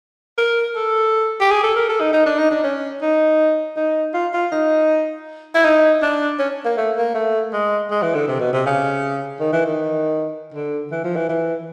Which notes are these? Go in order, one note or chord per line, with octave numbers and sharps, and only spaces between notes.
A#4
A4
G4
G#4
A4
A#4
A4
D#4
D#4
D4
D#4
D4
C#4
D#4
D#4
F4
F4
D#4
E4
D#4
D4
C#4
A#3
A3
A#3
A3
G#3
G#3
E3
D3
C3
B2
C3
C#3
D#3
E3
D#3
D3
E3
F3
E3
E3